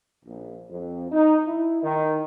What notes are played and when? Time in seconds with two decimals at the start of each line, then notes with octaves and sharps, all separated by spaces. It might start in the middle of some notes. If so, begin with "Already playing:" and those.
0.25 A#1
0.69 F2
1.12 D#4
1.46 E4
1.82 D#3